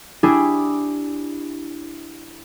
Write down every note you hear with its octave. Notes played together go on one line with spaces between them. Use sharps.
D4 E4 G4 G#4